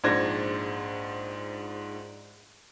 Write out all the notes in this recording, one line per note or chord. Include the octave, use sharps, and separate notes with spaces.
A#1 G#2 D4 C5 G#6 A#6